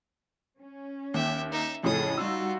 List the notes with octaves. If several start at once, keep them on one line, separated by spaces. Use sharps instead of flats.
C#4
D#2 E5 G5
D#4 E5
F2 A2 C#3 C#4 G#4 A4 D#6
G3 D#4 F4 F#4 E6